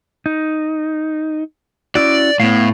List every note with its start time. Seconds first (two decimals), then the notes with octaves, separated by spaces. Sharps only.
0.26 D#4
1.95 C#4 E4 F#4 D5
2.40 A2 B3 F5